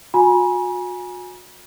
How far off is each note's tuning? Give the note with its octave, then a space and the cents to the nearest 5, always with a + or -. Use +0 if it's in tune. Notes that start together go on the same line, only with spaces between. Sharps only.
F#4 -40 G#5 +0 B5 -45